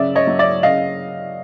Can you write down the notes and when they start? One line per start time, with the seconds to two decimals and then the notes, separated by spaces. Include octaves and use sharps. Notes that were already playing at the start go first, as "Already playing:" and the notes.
Already playing: C#3 F#3 D5 E5
0.16 C#5 D#5
0.27 F#3
0.39 D5 E5
0.63 C#3 D#5 F5